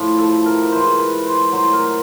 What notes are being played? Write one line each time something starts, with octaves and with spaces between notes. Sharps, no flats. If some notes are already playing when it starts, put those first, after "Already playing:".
Already playing: A2 F3
A4
A#4
B4
G#2 E3 C5
B4
C5
A2 F#3 C5
A#4